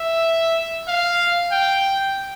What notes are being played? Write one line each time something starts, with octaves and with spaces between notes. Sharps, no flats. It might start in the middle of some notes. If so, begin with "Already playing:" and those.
Already playing: E5
F5
G5